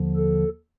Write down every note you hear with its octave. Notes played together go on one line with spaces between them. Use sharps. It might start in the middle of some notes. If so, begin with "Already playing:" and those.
Already playing: D#2 D3 F3
A4